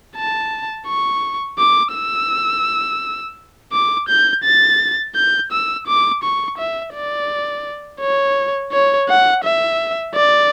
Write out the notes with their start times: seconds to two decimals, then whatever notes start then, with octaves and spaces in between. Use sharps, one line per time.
0.16 A5
0.87 C#6
1.58 D6
1.94 E6
3.73 D6
4.09 G6
4.44 A6
5.15 G6
5.52 E6
5.87 D6
6.23 C#6
6.58 E5
6.94 D5
8.01 C#5
8.72 C#5
9.09 F#5
9.44 E5
10.15 D5